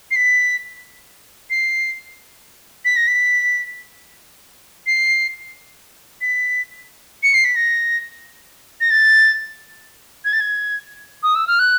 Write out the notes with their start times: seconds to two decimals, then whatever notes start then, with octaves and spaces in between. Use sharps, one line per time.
0.11 C7
0.16 B6
1.50 C7
2.85 B6
2.96 A#6
3.08 B6
4.87 C7
6.21 B6
7.23 C#7
7.34 C7
7.45 B6
7.56 A#6
8.81 A#6
8.91 A6
10.25 G#6
10.33 A6
10.41 G#6
11.23 D#6
11.35 E6
11.47 F6
11.59 F#6